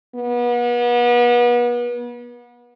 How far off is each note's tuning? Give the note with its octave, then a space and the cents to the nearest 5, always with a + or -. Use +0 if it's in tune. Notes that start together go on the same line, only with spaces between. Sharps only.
B3 -35